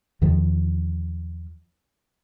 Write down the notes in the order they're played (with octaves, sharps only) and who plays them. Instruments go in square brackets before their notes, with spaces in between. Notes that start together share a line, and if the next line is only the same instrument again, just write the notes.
[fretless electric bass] E2 D#3 F3